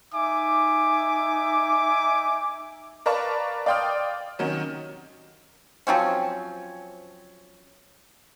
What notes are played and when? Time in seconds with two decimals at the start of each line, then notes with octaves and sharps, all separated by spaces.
0.13 D#4 E5 G#5 D6
3.06 A#4 B4 D5 F5 A5 C#6
3.66 D5 F5 G5 C6 D#6 F6
4.39 C3 D#3 F#3 C#4
5.87 F3 F#3 C4 C#4